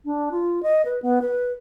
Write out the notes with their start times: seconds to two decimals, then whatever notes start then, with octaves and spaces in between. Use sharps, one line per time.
0.05 D4
0.32 F4
0.63 D#5
0.85 B4
1.02 B3
1.22 B4